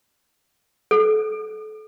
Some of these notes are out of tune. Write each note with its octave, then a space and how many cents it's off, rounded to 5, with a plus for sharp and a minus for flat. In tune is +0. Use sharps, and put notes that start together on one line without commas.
A4 -30